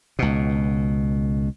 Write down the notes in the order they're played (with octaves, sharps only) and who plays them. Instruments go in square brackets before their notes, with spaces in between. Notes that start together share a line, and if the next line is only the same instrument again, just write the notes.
[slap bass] C#2 B2